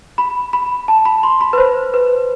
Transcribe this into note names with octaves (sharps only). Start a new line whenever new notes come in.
B5
B5
A5
B5
C6
B5
B4
C5
B4